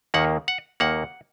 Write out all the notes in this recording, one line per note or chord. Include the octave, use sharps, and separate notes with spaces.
D#2 D#3 A#3 F#5
F#5
D#2 D#3 A#3 F#5